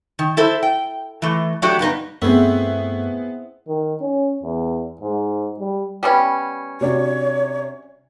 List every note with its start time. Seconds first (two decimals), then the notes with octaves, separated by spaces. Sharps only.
0.19 D#3
0.37 E4 A4 C5
0.63 G5
1.22 E3 A3
1.62 F#3 A3 D4 F#4 G4
1.79 G2 B3 D#4 B4
2.22 G2 A3 B3 C4 E4 G#4
3.68 D#3
4.01 C#4
4.43 E2
5.01 G#2
5.59 G3
6.03 G3 B3 C#4
6.81 C3 D4 F#4 C#5